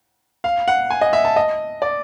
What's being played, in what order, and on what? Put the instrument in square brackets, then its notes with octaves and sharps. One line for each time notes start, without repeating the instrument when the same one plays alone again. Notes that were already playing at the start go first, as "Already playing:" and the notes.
[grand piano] F5
F#5
G#5
D#5
E5
A5
D#5
D5